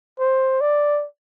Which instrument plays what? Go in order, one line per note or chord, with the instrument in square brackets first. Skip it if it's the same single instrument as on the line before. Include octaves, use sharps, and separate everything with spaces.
[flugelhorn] C5
D5